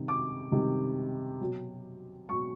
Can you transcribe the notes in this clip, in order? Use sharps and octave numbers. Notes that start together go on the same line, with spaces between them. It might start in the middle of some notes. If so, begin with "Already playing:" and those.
Already playing: C3 D#3 G3
D6
C3 D#3 G3
B2 F#3
B2 F#3 C#6